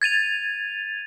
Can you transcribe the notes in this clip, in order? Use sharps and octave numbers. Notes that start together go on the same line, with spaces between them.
G#6 A6 D#7 F7